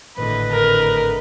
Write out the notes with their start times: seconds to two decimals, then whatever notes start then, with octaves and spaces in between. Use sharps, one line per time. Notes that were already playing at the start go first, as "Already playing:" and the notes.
0.17 G#1 A2 D3 B4 D#5
0.52 A#4